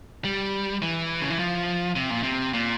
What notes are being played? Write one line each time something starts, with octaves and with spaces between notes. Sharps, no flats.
G3
E3
C#3
E3
F3
C3
A#2
C3
A#2